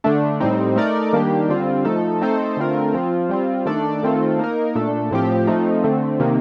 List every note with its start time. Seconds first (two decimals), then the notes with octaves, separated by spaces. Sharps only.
0.04 D3 A3 D4
0.40 A2 G3 C4 D#4
0.76 A3 D#4 A#4 D5
1.13 D#3 G3 A#3 D4 G4
1.49 D3 G3 C4 F4
1.85 F3 A3 D#4 A4
2.21 A3 C4 D#4 A4 C5
2.57 D3 A3 C4 F4 A#4
2.94 F3 C4 F4
3.29 G3 C4 F4
3.66 D#3 A3 D4 A4 D5
4.03 D#3 A3 C4 F4 A4
4.39 A#3 D#4 A#4
4.75 A#2 A3 D4 A4
5.11 A2 F3 C4 G4
5.47 F3 A3 C4 D#4
5.84 D3 A3 C4
6.20 C3 D#3 A#3